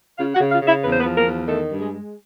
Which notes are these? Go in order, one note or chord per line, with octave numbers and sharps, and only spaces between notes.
C#3 F4 F5
F#4 F#5
C#3
F4 F5
C#3
E4 E5
E2 B4
C5
B3 B4
F3
A#3 A#4
E2
D#3 A3 A4
G2
G#3 G#4
G#3